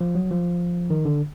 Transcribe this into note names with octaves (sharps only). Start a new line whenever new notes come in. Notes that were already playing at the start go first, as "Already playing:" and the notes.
F3
F#3
F3
D#3
D3